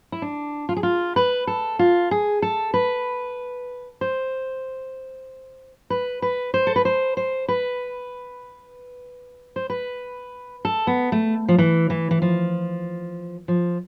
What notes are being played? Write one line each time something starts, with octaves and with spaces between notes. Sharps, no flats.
E4
D4
F4
G#4
F4
B4
A4
F4
G#4
A4
B4
C5
B4
B4
C5
A4
B4
C5
C5
B4
C5
B4
A4
B3
A3
F3
E3
E3
E3
F3
F3